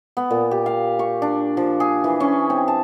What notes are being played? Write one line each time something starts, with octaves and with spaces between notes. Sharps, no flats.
B3
A#2
G4
F5
C#6
D4
F3
G#4
E3
C#4
C4
A5